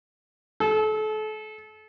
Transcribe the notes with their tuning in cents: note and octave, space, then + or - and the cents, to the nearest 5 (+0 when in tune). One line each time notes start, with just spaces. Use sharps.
A4 -35